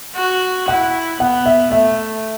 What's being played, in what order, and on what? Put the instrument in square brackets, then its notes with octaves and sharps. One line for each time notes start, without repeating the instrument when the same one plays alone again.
[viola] F#4
[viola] E4 [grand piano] F#5
[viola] B3 [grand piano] F#5
[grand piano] E5
[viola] A3 [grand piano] E5